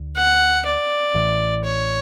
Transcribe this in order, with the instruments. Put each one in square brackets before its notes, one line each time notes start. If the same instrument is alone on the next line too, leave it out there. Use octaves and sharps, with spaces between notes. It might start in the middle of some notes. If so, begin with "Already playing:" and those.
Already playing: [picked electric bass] D2 D3
[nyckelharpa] F#5
D5
[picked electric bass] A1 A2 E3
[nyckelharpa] C#5